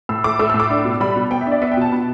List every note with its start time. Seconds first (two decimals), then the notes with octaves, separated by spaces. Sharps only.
0.09 A2 E6
0.24 A3 D6
0.39 A3 E6
0.50 A2 E6
0.60 D6
0.70 D4
0.85 B2
1.00 G3 B5
1.16 B2
1.31 B3 G5
1.41 E5
1.46 D4 D5
1.62 B3 E5
1.72 G5
1.77 B2 A5
1.92 B2 B5